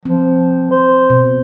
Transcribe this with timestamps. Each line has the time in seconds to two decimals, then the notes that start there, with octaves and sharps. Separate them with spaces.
0.05 F3 C4
0.71 C5
1.10 B2